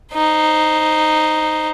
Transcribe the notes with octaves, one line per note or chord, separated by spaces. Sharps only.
D#4 C5